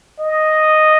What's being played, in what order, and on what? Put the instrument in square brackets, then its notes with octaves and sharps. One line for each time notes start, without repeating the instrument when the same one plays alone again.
[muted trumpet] D#5